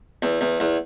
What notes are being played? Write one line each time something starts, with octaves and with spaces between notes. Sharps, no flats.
E2
E2
E2